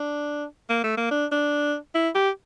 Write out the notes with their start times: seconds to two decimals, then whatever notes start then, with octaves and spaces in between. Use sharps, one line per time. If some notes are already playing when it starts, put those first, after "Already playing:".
Already playing: D4
0.69 A#3
0.84 A3
0.97 A#3
1.11 D4
1.32 D4
1.95 E4
2.15 G4